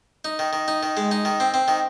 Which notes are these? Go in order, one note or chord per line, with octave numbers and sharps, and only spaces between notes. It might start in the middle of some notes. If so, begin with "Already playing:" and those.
D#4
D#3
D#3
D#4
D#3
G#3
D#4
D#3
C4
C4
D#3